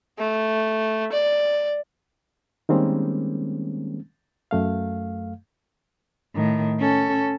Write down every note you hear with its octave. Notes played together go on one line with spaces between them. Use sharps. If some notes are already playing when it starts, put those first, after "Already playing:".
A3
D5
D#3 G3 G#3 A#3 C4 C#4
F#2 A3 F5
A2 D#3
C#4 A4